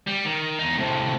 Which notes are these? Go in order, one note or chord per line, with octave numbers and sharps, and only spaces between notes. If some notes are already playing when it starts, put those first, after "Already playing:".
G3
D#3
E2 D#4
A2 C3